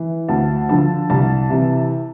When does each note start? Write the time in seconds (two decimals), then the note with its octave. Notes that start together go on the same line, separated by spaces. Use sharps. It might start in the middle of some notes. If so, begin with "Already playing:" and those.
Already playing: E3
0.29 D2 A5
0.69 D3 F3 A5
1.10 C2 A5
1.50 C3 E3